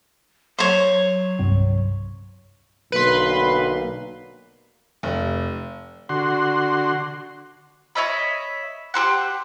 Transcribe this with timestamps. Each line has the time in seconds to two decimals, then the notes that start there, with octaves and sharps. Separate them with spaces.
0.59 F#3 C5 C#5
1.39 C2 G2 C3
2.92 B1 D3 A#3 B4 C6
5.03 F1
6.09 D3 F#4 C6
7.95 C#5 D#5 E5 B5
8.94 G4 A#4 C5 F#5